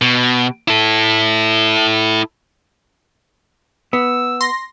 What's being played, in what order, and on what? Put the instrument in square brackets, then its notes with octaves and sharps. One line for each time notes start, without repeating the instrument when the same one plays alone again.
[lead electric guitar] B2
E4 A4
[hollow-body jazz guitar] B3 [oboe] E6
[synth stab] C6 A#6